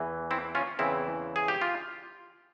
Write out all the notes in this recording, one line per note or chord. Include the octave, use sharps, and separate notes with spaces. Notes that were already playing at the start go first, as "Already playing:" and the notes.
Already playing: E2 E3
C4 E4
C#4 F4
E2 C#3 E3 C4 E4
G#4
G4
F4